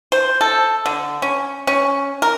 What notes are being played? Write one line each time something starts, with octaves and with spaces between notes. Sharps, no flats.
C5
A4
D3
C#4
C#4
A#4